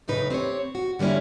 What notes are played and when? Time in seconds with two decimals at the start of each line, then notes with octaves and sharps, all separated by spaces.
0.08 F#2 A2 C#3 D#4 B4
0.30 C4 G4 C5 C#5
0.75 F#4
0.99 D3 G3 A#3 C#4 E4